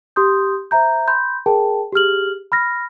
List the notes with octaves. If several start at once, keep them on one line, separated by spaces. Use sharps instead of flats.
G4 C6 D#6 G6
C5 E5 A#5 G6
B5 C6 G6
G#4 A#4 G5 A5
G4 G#4 F6 F#7
B5 F6 A#6